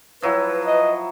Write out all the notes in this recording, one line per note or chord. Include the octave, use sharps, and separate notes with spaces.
F3 F#3 E4 B4
D#5